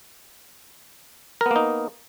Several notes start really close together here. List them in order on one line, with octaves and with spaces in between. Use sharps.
A#4 B3 A#3 D#4